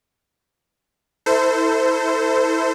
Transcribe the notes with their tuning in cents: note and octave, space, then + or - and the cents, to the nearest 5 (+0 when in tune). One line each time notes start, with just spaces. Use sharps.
E4 -20 A4 +25 C5 -20